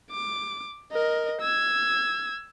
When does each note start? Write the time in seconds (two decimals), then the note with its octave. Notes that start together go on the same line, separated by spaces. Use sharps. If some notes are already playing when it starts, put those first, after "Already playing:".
0.11 D6
0.92 A#4 D#5
1.41 E6 G#6